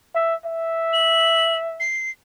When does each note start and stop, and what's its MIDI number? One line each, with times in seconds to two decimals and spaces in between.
0.15 0.35 76
0.46 1.89 76
0.93 1.55 102
1.80 2.10 96